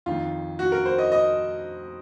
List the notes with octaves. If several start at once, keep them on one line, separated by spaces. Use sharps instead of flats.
F2 D#3 F4
F#4
A#4
C5
D#5
D#5